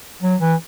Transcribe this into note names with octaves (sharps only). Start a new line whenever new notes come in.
F#3
E3